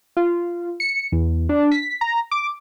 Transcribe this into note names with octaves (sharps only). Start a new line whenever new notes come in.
F4
C#7
E2
D4
B6
A#5
D6